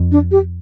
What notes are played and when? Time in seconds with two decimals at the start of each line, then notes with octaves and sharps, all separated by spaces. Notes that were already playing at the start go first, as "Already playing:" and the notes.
Already playing: F2
0.12 D4
0.32 G4